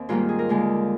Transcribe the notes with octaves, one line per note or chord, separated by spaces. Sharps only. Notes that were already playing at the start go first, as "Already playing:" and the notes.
Already playing: D#2 C4
G#2 D#3 G3 A#3 F4
G#4
A#4
D#2 D3 G#3